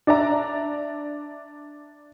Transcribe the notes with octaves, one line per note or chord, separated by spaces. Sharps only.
D4 D5 E5 A#5